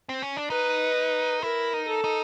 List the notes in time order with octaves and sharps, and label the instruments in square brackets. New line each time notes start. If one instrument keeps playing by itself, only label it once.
[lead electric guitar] C4
C#4
D4
[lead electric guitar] D#4 [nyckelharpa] B4
[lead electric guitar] E4 [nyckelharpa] A#4
[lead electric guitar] D#4
[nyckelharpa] A4
[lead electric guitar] D#4